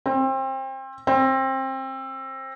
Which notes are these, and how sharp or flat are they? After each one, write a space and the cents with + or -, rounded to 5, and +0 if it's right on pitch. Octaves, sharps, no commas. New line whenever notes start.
C4 +30
C4 +25